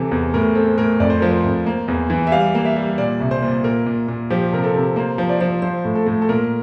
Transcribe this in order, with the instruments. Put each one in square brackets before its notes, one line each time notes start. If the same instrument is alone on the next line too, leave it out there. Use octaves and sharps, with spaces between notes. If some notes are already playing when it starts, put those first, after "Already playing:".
Already playing: [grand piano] C3 E3 A4
E2
A2 A#4
C4 A4
A2 A#4
F2 D5
C5
F3 A#4
C5
F2
A#3
E2
E3
E5
G3 F5
A#3
E5
G3
A#2 D5
C2
C5
A#2
A#2 A#4
A#2
A#2
F3 G4
C3 A#4
A4
C3
A#3 C5
F3
D5
F3
F3 C5
A2
A4
A2
A4
A#2 A#4